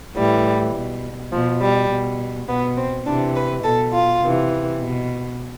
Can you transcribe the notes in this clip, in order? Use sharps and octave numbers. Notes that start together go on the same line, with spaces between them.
A2 E3 G3
B2
B2 F3
G3
B2
B2 B3
C4
C3 E3 D4
B4
B2 A4
F4
C3 E3
B2